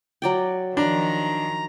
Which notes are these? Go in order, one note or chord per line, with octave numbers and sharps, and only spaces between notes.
F#3 D5 G5
D#3 F3 D4 A#5